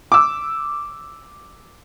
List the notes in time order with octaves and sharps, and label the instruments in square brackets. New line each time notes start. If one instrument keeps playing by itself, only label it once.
[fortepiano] D6 E6